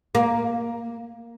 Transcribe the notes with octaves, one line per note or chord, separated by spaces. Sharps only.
A#3